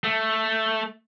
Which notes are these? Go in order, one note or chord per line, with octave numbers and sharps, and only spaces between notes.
A3